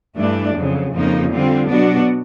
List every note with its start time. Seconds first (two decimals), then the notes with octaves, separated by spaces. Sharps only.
0.16 G2 E3 A3 D4
0.54 F2 C#3 F#3
0.93 F2 C#3 F3 A#3 D#4
1.31 D3 G3 C4 F4
1.69 B2 F#3 B3 D4 F#4